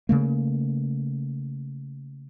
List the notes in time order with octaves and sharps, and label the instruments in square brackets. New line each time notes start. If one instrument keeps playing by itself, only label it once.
[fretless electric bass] C#3 A3 A#3